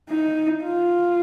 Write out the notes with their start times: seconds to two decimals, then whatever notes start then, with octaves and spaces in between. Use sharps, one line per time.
0.10 D#4
0.64 F4